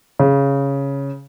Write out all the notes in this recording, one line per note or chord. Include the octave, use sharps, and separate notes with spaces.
C#3